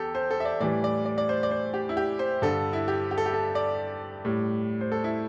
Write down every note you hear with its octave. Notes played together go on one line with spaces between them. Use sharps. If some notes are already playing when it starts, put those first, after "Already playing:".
Already playing: E2 G4 A4
C5
A4
E5
D5
A2 E3 G3 D5
D5
D5
D5
C5
D5
C5
G4
E4
G4
C5
G2 D3 G3 A4
E4
G4
G4
A4
G4
A4
D5
A2 G3
C5
A4
E4